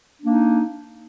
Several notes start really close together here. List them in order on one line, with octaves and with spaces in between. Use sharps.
D4 A#3 D#4